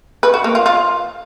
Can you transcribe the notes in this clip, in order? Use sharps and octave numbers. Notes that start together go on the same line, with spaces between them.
B4
F#4
A#3
F4
F4